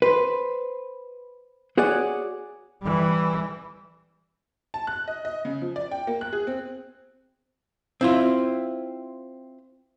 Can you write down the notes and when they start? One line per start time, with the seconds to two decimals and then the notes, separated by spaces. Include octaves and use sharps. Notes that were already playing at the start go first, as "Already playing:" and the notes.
0.02 B4 C5
1.78 F#4 G#4 C#5 D5 F#5
2.82 E3 G3
4.74 A5
4.87 F#6
5.08 D#5
5.25 D#5
5.45 C#3
5.61 F3
5.76 D5
5.91 G5
6.07 A#3
6.21 F#6
6.33 G#4
6.47 C4
8.01 C4 E4 F4